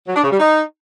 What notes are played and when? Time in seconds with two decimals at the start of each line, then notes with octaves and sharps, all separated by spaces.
0.07 F#3
0.15 D4
0.23 C#3
0.31 G3
0.39 D#4